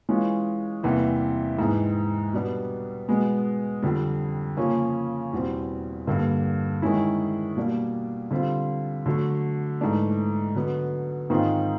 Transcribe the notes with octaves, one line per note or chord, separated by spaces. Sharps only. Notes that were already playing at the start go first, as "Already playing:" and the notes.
E3 G#3 C#4 F4
E2 C3 E3 G3 A#3
G#2 E3 G#3
B2 G3 B3 D4
B2 G#3 B3
F2 D3 G3
C#3 F3 A#3 C#4
E2 B2 G3 C4
G2 D3 G3 A#3
D#3 G#3 C#4 E4
B2 G3 A#3 D4
D3 G3 C4 F4
D3 F#3 A3
G#2 E3 A3 D4
D3 F#3 B3
G#2 D#3 G#3 C4 F4